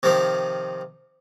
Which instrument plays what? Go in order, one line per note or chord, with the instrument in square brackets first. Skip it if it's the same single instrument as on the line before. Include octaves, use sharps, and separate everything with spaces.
[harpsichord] C3 D#3 F3